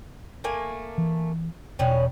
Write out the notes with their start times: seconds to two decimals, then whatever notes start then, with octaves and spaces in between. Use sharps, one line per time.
0.44 A3 A#3 G#5
0.98 E3
1.79 E1 B2 F#3 G3 C#4